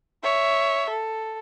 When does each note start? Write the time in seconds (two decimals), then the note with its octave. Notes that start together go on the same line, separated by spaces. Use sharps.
0.23 C#5 E5
0.90 A4